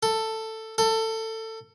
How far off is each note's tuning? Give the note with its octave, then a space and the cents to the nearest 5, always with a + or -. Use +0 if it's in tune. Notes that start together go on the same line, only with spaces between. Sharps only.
A4 +10
A4 +20